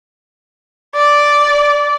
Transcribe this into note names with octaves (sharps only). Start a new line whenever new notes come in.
D5